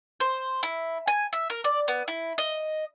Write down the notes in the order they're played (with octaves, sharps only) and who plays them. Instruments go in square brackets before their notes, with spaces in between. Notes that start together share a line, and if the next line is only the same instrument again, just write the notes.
[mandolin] C5
E4
G#5
E5
A#4
D5
B3
E4
D#5